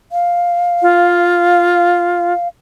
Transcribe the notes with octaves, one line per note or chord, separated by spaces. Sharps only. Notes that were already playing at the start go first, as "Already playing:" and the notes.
F5
F4